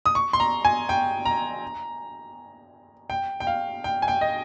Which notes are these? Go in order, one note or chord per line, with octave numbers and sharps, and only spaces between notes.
D#6
C#6
C6
A#5
G#5
G5
A#5
G5
G5
F5
G5
G#5
G5
D#5